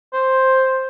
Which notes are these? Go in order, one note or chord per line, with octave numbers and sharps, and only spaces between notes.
C5